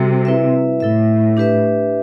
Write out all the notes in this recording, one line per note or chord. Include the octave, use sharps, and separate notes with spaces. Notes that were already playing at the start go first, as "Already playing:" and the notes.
Already playing: C3 G3 C4 F#4 A4
E4 B4 E5
A2 E4 A4 E5
D4 G4 B4 E5